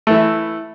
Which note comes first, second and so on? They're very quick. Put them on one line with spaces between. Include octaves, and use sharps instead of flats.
A3 E3 E4